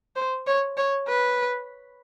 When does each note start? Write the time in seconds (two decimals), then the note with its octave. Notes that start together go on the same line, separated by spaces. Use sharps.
0.16 C5
0.47 C#5
0.77 C#5
1.09 B4